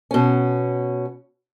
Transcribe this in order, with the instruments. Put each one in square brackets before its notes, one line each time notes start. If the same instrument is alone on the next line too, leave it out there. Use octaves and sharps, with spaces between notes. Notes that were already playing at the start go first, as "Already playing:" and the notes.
[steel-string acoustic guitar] B2 C#4